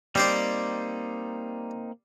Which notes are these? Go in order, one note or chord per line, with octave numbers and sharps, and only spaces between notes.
G3 A#3 C4 D#4 C5 D5